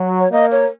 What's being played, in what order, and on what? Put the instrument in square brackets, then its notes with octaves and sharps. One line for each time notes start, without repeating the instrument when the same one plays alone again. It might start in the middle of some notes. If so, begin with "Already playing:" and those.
Already playing: [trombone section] F#3
[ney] C#5
[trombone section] A#3 [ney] D#5
[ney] C#5